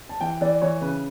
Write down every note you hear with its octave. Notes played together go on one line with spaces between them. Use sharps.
A5
E3 G5
E3 D5
E3 C#5
C#3 B4